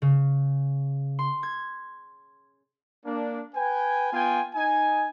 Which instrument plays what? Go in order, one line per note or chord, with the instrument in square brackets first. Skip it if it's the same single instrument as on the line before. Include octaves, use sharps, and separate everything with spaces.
[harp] C#3
C6
G#6
[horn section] A#3 D4
B4 G5 G#5
B3 F4 G5 G#5
D#4 G#5